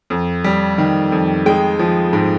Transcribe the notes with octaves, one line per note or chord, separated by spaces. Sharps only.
F2
G3
D#3
F2
G#3 G5
F3
G#2